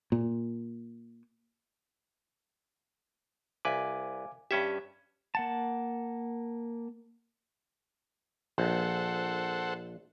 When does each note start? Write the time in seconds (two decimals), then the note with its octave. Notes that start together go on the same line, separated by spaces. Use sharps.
0.12 A#2
3.65 C2 B4 F5 G#5 D6
4.51 G2 C#4 G4 E5
5.35 A#3 F#5 A5
8.58 A#1 A4 C5 F#5